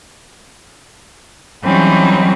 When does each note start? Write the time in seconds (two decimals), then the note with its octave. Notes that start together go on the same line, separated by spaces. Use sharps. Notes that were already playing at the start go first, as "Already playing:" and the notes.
1.64 E3 F#3 G3 C4 C#4 D#4